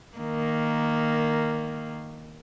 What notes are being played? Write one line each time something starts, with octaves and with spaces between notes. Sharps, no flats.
D#3 A#3